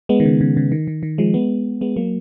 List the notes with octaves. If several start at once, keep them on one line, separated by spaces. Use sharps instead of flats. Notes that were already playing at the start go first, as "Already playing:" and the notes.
G#3 B3
D#3
C#3
C#3
C#3
D#3
D#3
D#3
F3 G#3
G#3 B3
G#3 B3
F#3 A#3